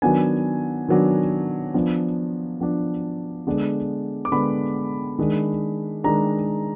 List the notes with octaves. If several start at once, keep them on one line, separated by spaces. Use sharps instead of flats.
D#3 F#3 B3 D4 G#5
D#3 F#3 B3 D4
F3 B3 D4
F3 B3 D4
D3 G#3 B3 D4
D6
D3 G#3 B3 D4 B5
D#3 G#3 D4
D#3 G#3 D4 A#5